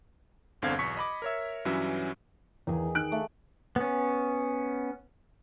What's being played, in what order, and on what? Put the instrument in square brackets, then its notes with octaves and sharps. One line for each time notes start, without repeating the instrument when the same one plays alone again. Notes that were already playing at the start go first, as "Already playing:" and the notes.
[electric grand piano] G1 E2 D3 C4 F5 G#6
B1 E2 C#6 B6 C#7
D#5 B5 D6
A#4 C#5 E5
G2 E3 F#3 C#4 F#4 E5
[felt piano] E2 [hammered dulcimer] D#3 G#4
[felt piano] D#3 F#6 D7
[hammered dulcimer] A3
[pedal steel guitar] B3 C#4